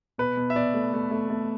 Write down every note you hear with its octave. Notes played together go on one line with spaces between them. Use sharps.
B2 B4
B2
E5
B2 D5
A3
A3
A3
A3